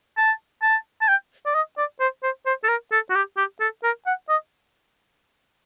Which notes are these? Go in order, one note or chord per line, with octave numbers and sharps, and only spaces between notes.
A5
A5
A5
G5
D5
D#5
D5
C5
C5
C5
A4
A#4
A4
F#4
G4
G4
A4
A#4
F#5
D#5